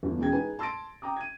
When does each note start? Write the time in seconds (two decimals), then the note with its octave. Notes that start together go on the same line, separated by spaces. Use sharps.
0.03 G1 E2
0.19 E1 G#3 C#4 G#4 G5 G#6
0.32 D#4 G#4 B4 G#5
0.59 A5 C6 E6 A6 A#6 D7
1.02 G5 A#5 D6 D#6
1.16 G#6 D#7